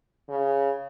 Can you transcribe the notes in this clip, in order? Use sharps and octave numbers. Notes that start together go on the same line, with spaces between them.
C#3